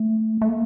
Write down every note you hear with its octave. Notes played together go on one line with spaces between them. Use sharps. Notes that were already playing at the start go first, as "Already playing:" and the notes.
Already playing: A3
A3
A#3